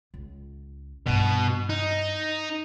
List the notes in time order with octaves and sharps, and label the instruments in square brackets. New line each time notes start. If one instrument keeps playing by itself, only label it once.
[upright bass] C#2
[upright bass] G2 E4 [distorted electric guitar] B2
[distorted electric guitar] D#4